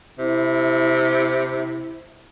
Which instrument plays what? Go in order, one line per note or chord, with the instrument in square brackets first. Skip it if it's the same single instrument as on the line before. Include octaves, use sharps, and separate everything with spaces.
[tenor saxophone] C3 [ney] E4